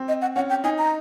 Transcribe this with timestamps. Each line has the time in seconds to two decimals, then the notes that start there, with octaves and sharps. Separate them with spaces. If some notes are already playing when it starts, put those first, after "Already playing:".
Already playing: C4
0.08 D#5
0.22 F#5
0.36 C#4 F#5
0.50 G5
0.64 D#4 G#5
0.78 A#5